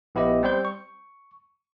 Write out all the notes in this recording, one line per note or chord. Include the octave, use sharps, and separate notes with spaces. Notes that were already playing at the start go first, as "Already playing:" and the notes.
A#1 B3 E4 G4 D#5
G3 C4 C5 G6
C#6